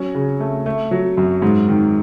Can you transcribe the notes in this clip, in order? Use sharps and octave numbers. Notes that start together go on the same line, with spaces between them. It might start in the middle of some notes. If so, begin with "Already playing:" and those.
Already playing: F#3 C#4
C#3
A3
A3
F#3
F#2
G#2
D#3